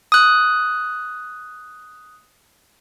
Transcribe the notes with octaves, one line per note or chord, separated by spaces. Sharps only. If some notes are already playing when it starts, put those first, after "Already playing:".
D#6 F#6